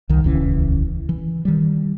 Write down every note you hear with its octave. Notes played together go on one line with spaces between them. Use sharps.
C2 D#3
D#1 C#2 E3 C#4
E3
D#3 G3